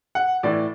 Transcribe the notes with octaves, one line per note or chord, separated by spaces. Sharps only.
F#5
A2 E3 D5